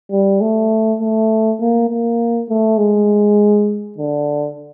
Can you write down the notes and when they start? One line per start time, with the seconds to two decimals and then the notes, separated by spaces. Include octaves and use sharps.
0.11 G3
0.41 A3
1.00 A3
1.60 A#3
1.90 A#3
2.49 A3
2.78 G#3
3.98 D3